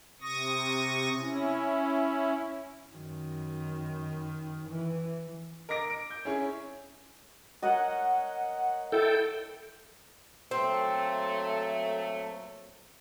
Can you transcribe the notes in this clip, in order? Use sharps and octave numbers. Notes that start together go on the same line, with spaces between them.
C3 C#6 D#6 A#6
C#4 E4
F#2 D#3
E3
A#4 D#5 D6 A#6 D7
D7
G6
C#4 E4 G#4 C#5
A#4 C#5 D#5 F#5
E4 A4 G5
A#2 F#3 A3 C4